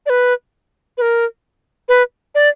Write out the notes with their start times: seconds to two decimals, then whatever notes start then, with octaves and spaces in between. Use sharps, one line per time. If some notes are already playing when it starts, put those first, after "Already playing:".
0.06 D5
0.10 B4
0.98 B4
1.02 A#4
1.89 B4
2.35 D5